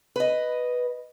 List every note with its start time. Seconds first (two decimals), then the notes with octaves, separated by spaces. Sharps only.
0.16 B4 D#5